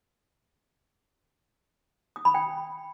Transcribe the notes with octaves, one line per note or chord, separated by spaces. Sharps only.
D#6
B5
G5